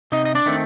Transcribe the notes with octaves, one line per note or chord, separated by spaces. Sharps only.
C3 D#4 D#5
D#5
D4 D5
D#3 A3 C4